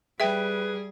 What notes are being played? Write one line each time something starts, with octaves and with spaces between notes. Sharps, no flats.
G3 G#4 B4 E5 G5